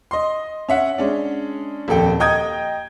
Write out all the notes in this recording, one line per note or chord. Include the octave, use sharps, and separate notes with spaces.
D#5 C6
C#4 E5 F#5
G#3 C#4 D4
D#1 F2 A4 G5
D#5 G5 A#5 D#6 G6 G#6